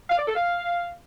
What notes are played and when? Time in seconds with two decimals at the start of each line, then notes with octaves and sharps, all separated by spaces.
0.09 F5
0.18 D5
0.27 A4
0.36 F5